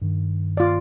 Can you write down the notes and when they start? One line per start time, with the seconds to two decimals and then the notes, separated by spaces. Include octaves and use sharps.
0.02 G2 D#3
0.57 F4 D5